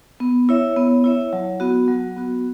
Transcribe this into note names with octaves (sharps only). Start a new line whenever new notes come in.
B3
E4 C#5 E5
B3
E4 C#5 E5
F#3
B3 F#4
F#3
B3 F#4